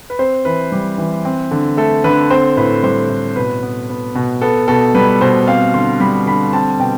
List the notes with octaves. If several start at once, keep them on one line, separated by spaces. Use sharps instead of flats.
B4
C4 C5
E3 B4
G3
E3
C4
D3
A3 A4
D3 B4
C4 C5
A2 B4
G3 C5
A2
B2 B4
B3
B3
B2
B3 A4
B2 A4
G3 B4
B2 C5
C4 F5
D3 C6
G3 B5
D3 B5
C4 A5
B2 G5